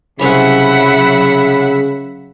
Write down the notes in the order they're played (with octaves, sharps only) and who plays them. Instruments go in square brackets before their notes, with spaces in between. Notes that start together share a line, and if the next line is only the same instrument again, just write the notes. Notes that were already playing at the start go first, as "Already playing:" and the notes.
[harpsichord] C2 C#4 C5 [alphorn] C#3 [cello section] F#3 E5 [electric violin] F#5 B5